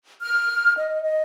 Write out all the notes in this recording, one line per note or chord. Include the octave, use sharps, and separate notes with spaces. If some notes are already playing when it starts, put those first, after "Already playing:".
F6
D#5
D#5